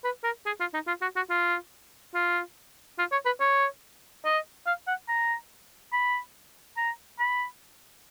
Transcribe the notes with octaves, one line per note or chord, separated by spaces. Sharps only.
B4
A#4
G#4
F4
D#4
F4
F#4
F#4
F4
F4
F4
C#5
B4
C#5
D#5
F5
F#5
A#5
B5
A#5
B5